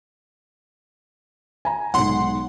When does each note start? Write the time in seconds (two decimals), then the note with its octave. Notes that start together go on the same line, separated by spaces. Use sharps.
1.65 G#5 A#5
1.94 B1 G#2 F#5 C6